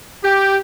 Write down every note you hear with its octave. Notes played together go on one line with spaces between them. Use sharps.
G4